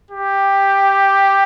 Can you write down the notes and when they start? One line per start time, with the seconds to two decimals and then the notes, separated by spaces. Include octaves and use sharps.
0.11 G4